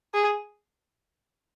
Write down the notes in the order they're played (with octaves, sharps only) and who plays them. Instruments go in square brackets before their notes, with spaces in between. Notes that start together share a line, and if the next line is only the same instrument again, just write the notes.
[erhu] G#4